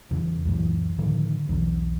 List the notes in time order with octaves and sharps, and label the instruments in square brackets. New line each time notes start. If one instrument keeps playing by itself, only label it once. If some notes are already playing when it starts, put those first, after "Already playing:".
[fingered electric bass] E2 C#3
C#2 F#2 A#2 E3
A2 D3 D#3 F3
B1 E2